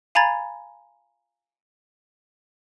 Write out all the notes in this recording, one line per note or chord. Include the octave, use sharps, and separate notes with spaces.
F5 G#5 A#5 B5 G#6 A6